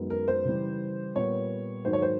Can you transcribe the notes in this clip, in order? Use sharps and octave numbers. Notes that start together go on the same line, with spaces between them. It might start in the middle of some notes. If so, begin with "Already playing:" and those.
Already playing: F#2 D#3 G#3 B3
A#4
C5
C#3 E3 G3
A#2 G3 B3 C#5
G#2 D#3 F#3 A#3 C5
C#5
C5